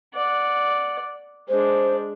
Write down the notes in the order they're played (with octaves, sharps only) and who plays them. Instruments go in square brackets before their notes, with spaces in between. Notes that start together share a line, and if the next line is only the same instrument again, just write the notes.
[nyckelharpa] D5 F#5
[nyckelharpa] G#3 D4 [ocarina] C5